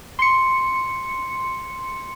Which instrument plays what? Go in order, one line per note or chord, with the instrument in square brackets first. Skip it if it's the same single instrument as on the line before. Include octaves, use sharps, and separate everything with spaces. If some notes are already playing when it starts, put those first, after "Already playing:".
[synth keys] C6 C#7